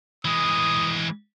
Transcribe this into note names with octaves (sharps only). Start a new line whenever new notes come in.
E3 G#3 D#6